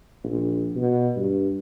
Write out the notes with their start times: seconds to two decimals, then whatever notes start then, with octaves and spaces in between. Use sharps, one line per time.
0.24 A#1
0.76 B2
1.16 G2